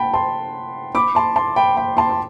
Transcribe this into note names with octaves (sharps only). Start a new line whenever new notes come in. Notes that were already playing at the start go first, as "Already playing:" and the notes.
Already playing: F#5 G5 A5 B5
A5 C6
B5 D6
A5 C6
A5 C6
G5 B5
G5 B5
A5 C6
C6